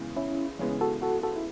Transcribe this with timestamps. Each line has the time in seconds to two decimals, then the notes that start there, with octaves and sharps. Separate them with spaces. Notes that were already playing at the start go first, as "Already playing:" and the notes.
Already playing: C#3 E3 G#3 B3
0.16 C#4 E4
0.59 C#3 E3 G#3 B3 C#4
0.81 F#4 A4
1.02 F#4 A4
1.23 F#4 A4
1.36 E4